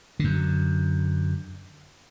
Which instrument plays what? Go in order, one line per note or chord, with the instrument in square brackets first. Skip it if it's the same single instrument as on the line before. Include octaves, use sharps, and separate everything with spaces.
[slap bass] F#2 D3